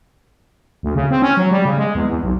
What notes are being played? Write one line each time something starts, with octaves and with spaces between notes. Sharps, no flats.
D2
C#3
C4
C#4
F#3
G3
C#3
G#3
E2
E2
B1